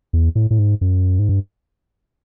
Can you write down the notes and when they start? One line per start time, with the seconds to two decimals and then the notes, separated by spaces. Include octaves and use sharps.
0.13 E2
0.35 A2
0.51 A2
0.59 G#2
0.81 F#2
1.19 G#2
1.29 G2